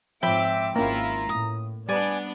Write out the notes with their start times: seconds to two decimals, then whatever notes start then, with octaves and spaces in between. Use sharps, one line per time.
0.23 G#2 F3 C4 C#5 E5 G5 B5 D6
0.76 G#1 A#3 C#4 E4 F4 A#5
1.29 A2 D#6
1.89 G3 B3 D4 D5 G#5